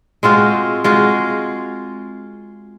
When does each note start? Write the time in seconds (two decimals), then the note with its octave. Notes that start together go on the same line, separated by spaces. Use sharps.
0.23 G#3 C4 F4 F#4
0.84 G#3 F4 F#4